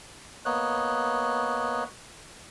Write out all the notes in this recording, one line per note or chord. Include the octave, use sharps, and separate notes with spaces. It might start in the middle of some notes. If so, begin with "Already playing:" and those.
A#3 B3 C#5 D#5 F#6